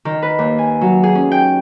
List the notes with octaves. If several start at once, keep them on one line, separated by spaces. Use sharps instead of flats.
D#3
B4
D#2
G#5
F#3
G#4
C#4
G5